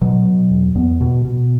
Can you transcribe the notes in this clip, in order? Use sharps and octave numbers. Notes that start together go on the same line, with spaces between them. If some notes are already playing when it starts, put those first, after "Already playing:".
B2 F#3
B2
E2
E2 B3
B2
B2